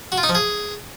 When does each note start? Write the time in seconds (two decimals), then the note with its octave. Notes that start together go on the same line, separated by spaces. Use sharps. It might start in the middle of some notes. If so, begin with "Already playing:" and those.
0.12 F#4
0.18 F4
0.23 D#4
0.29 F3
0.35 G#4